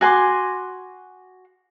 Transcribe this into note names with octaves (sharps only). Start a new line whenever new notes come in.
F#4 G#5 C6 D6